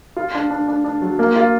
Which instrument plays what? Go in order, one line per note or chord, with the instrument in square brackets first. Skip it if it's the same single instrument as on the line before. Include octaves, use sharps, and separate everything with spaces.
[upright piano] F4
D4
D4
D4
D4
F#3
A#3
F4